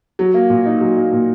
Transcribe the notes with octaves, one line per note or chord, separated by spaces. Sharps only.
F#3
A#3
A#2
D#4
F#3
A#3
A#2